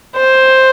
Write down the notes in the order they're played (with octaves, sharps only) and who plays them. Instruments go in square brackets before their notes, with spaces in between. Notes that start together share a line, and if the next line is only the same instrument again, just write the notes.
[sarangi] C5